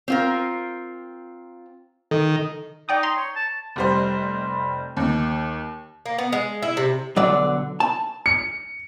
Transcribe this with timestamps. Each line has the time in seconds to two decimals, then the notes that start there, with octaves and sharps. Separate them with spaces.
0.08 C4 F4 A#4
2.11 D#3 A4
2.89 D#4 D5 G5 D#6
3.03 A#5 C6
3.17 C#5
3.36 A5
3.76 F1 G3 C5
4.97 D#2
6.06 A#3
6.18 B3
6.32 G#3
6.62 E4
6.77 C3
7.16 B1 D3 F#3 D5
7.80 A5
8.26 C#7